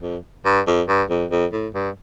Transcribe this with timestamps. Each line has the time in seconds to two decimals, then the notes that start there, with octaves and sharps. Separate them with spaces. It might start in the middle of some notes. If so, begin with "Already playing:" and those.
0.02 F2
0.45 G2
0.67 F2
0.88 G2
1.10 F2
1.31 F2
1.53 A2
1.74 G2